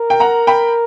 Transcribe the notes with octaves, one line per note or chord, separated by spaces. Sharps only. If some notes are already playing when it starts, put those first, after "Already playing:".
Already playing: A#4
G5
F#5 A#5
G5 B5